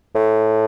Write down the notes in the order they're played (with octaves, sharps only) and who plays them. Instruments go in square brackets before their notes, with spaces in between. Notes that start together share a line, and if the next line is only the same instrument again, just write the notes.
[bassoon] A2